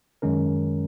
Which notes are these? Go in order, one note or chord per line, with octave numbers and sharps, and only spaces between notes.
F#2 D#3 G#3 C#4 A#4